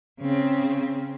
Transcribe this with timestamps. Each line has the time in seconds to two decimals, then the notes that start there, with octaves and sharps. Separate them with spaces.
0.21 C#3 C4